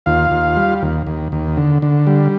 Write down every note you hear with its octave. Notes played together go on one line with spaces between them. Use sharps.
D#2 F4 F5
D#2
G3
D#2
D#2
D#2
D3
D3
G3